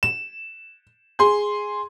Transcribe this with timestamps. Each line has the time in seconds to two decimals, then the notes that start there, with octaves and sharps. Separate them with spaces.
0.03 E7
1.19 G#4 C6